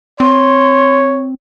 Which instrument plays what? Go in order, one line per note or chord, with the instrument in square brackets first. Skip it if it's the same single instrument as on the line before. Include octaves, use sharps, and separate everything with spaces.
[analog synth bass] C4 [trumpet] C#5 [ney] C6